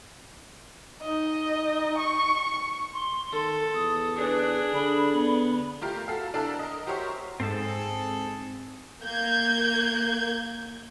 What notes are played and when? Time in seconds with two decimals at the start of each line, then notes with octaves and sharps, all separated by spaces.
1.02 D#4 D#5
1.98 C#6
2.93 C6
3.32 D#3 A4
3.74 E2 D#6
4.17 D4 G#4 B4
4.74 D3 B5
5.16 B3
5.81 A3 F4 G4 A#4
6.08 F#4 A4 F5
6.34 D4 E4 A4 A#4 A5
6.59 A#4 D#5
6.87 F#4 G4 A#4 C5 C#5 E5
7.40 G#2 C4 G#4 A4 A5
9.04 A#3 G6 G#6